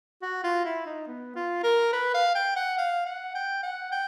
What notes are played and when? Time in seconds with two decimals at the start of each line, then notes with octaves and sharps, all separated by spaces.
0.22 F#4
0.44 F4
0.65 E4
0.86 D#4
1.07 B3
1.36 F4
1.64 A#4
1.93 B4
2.15 F5
2.35 G5
2.57 F#5
2.78 F5
3.06 F#5
3.35 G5
3.63 F#5
3.92 G5